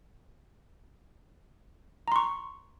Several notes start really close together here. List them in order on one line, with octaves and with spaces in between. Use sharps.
A#5 C6 C#6